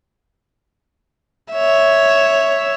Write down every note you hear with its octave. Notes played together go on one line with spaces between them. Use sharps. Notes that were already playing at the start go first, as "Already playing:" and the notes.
C#5 E5